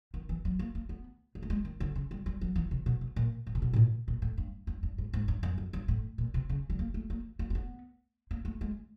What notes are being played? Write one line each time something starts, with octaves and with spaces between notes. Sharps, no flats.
D#3
E3
F#3
A#3
A#3
B3
A#3
A3
G#3
D#3
D3
C#3
G3
G3
F#3
E3
C3
B2
B2
A#2
A2
C3
B2
A2
A#2
A#2
A2
G2
G2
G2
G#2
G#2
G2
F#2
F2
G2
A2
A#2
C3
C#3
G3
A#3
A3
A#3
A#3
A#3
B3
A#3
A3
G#3